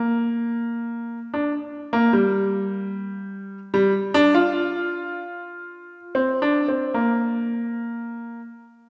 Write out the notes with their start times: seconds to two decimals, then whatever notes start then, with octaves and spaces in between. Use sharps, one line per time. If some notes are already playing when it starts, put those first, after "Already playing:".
Already playing: A#3
1.34 D4
1.93 A#3
2.13 G3
3.74 G3
4.14 D4
4.34 F4
6.15 C4
6.42 D4
6.68 C4
6.94 A#3